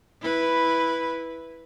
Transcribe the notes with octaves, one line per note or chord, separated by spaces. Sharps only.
E4 B4